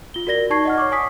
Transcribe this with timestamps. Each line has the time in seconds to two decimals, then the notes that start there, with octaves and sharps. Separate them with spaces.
0.14 F4 G7
0.27 F#4 A#4 D5 A#6 G7
0.50 D#4 D5 A5 C#6 G#6 C7
0.65 D#5 F#5 F6
0.78 C#5 C#6 D6
0.92 G#5 C#6 D#6 B6